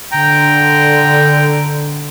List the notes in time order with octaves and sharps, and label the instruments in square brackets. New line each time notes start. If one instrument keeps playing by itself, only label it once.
[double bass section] D3 [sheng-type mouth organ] G5 A#5